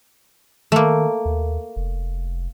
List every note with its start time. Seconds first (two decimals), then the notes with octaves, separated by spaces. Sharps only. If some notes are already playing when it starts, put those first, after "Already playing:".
0.72 D#3 A3 A#3
1.25 D#2
1.76 F1